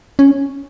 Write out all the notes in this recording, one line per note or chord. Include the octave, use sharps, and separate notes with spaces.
C#4